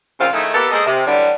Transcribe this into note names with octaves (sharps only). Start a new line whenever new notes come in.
A#2 C#3 F3 C4 F4
D#3 A3 D#4 E4 G#4 A4
A#3 B3 G4 A4
G#3 A#3 G#4 A4 C5 D#5
C3
D3 E3 F#3 G3